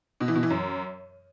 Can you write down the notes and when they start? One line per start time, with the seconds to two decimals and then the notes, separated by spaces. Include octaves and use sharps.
0.20 B2
0.28 E3
0.35 B2
0.43 E3
0.50 F#2